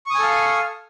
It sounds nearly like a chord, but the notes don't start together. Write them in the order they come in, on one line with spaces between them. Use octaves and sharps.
C#6 D#6 G#5 A4 F5